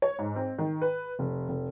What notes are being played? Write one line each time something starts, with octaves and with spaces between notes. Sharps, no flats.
C#5
G#2
C4
D#3
B4
F1
F1